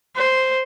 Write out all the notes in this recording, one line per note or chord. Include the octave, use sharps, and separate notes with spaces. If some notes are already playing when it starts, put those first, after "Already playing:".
C5